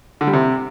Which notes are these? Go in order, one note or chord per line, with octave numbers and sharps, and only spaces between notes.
D3
G3
C3